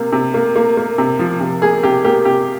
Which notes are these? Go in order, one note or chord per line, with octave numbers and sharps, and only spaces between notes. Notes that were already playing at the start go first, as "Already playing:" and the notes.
Already playing: C3 A#3
C3
A#3
A#3
A#3
C3
F3
C3
A#3 G#4
C3 G4
A#3 G4
C3 G4